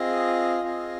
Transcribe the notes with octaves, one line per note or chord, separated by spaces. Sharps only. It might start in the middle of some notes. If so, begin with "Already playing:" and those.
Already playing: C4 F4 G#4 D#5
C4 F4 G#4 D#5